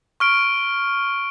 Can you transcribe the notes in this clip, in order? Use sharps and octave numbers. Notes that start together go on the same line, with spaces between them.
C#6 F6 D7